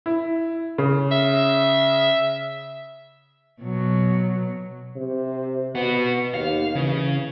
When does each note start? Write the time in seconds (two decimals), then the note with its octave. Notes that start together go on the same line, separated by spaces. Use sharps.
0.06 E4
0.78 C#3
1.12 E5
3.62 B2 F#3
4.96 C3
5.75 B2 B3 F#4
6.34 D#2 F5
6.75 C#3 E3